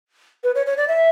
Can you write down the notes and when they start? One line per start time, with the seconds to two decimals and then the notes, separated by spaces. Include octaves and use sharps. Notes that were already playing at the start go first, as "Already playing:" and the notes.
0.44 B4
0.55 C#5
0.66 C#5
0.77 D5
0.88 E5